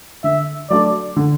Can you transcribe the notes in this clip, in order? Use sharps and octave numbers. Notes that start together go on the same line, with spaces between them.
D3 E5
F#3 A3 D4 D5
D3